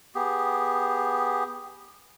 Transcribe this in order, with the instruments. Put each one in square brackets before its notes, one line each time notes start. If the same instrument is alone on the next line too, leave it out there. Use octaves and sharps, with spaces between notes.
[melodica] B3 G4 G#4